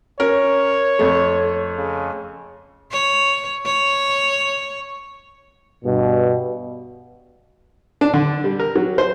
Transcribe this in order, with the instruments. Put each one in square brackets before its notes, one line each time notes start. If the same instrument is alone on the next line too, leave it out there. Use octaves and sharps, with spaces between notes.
[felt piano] C#4 A#4 [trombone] C#5
[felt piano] F2 A3
[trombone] C#3
[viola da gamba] C#5
C#5
[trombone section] G2 B2
[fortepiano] D4
D3
G3
A#4
F#3
C5